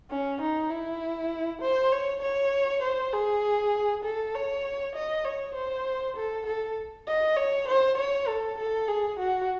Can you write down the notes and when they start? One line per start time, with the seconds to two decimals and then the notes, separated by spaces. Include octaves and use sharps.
0.10 C#4
0.41 D#4
0.70 E4
1.61 C5
1.92 C#5
2.22 C#5
2.82 C5
3.12 G#4
4.04 A4
4.34 C#5
4.95 D#5
5.24 C#5
5.55 C5
6.16 A4
6.46 A4
7.07 D#5
7.36 C#5
7.68 C5
7.97 C#5
8.27 A4
8.58 A4
8.88 G#4
9.19 F#4